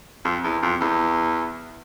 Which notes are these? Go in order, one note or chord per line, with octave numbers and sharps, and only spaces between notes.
F2
E2
F2
E2